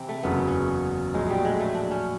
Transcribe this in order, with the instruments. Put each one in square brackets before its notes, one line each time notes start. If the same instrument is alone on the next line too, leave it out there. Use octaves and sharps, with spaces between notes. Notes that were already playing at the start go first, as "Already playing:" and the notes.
Already playing: [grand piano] C3 E3 [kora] C4
[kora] A3
[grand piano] F#1 E2 C#3 F#3 [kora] B3
[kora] C#4
[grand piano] A#1 A2 F#3 [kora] G#3
[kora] G3
G#3
A3
D4
C#4